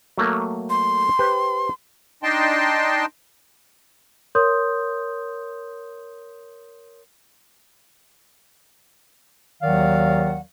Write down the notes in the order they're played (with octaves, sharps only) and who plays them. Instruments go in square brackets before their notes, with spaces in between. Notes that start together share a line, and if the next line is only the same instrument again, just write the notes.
[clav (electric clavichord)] F#3 A3 A#3
[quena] C6
[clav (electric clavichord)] G4 B4 C5
[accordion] D4 D#4 D#5 G5 A5 C6
[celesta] A#4 C#5 C6 D#6 G6
[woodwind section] D#2 D#3 F#3 D5 F5 F#5